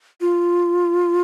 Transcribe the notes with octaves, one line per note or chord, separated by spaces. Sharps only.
F4